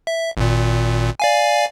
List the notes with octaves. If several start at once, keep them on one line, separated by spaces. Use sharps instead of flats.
E5
G#1 A#2
D5 F5 G#5